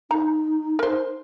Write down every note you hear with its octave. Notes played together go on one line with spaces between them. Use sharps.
D#4 A#5
A#4 C5